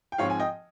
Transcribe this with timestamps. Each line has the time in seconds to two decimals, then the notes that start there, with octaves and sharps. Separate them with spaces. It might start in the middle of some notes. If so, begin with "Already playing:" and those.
0.12 G5
0.18 G#2 F3 C4 C#5 F5
0.30 G#5
0.40 D#5 G5